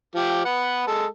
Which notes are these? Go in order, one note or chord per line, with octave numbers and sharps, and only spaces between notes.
F3 G4
B4 F#5
G#3 A4